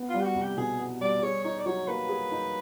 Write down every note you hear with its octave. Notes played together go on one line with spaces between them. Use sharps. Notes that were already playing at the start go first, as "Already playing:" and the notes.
Already playing: B3
G3 F4
G4
F#4
C2
G4
B2 G#4
B3
G3 D5
G#4 C#5
D#4 C#5
D5
F#3 C#5
A#3 B4
G#4
D#4